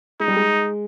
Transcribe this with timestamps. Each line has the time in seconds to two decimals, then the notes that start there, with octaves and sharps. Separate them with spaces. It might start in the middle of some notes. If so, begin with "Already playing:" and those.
0.20 G#3 D#4
0.28 G3
0.36 G#3